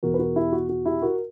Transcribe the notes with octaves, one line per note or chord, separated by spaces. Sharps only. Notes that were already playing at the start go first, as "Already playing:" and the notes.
E2 B2 F#4 A#4
B4
F#4 A#4
E4 G4
F#4
F#4
E4 G4
F#4 A#4